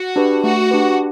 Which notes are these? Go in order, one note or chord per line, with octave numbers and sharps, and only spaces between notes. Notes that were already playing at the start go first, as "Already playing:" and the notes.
Already playing: F#4
D4 G4 B4
A3 F#4
D4 G4 B4